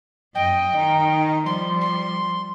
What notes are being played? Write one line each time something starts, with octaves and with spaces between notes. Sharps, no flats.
F#2 D#5 G5
D#3 D#4
F3 G3 C6
C6